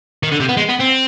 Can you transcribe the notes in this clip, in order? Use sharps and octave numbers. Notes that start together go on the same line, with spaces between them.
D#3
D3
C3
B3
G#3
B3
C4